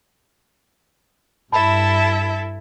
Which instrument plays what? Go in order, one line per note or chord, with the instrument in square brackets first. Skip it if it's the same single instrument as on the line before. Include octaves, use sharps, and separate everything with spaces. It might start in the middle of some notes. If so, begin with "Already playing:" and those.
[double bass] G2 [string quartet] E4 A4 E5 [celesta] A5 B5